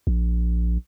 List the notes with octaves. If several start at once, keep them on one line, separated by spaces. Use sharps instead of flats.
A#1